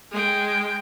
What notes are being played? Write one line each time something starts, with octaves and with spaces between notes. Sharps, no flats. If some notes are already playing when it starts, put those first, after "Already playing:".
G#3 G5